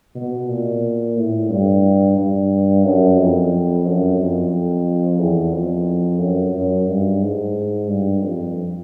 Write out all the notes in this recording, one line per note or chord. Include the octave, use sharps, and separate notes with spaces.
B2
A#2
A2
G2
G2
F#2
F2
F#2
F2
E2
F2
F#2
F#2
G2
G#2
G2
F2